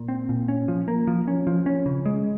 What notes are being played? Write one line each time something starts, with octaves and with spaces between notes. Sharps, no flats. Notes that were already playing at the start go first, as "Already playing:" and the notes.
Already playing: A#2
C4
A#2
C#4
F3
A#3
F3
C#4
F3
C#4
C#3
G#3